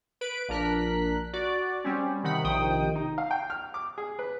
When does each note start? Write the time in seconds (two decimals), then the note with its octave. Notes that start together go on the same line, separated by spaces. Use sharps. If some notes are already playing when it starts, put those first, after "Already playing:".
0.21 B4 D7
0.49 A#1 D4 A#4 F#6 B6
1.33 F#4 D5
1.84 G3 C4 C#4
2.24 C3 D#3 F#5 B5
2.44 A#1 C3 D#3 G5 D#6
2.96 D#4
3.18 F5
3.31 G5
3.50 F6
3.74 D6
3.98 G#4
4.19 B4